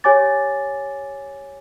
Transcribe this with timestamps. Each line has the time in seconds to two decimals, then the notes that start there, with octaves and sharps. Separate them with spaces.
0.04 G4 C#5 G#5 D6 A6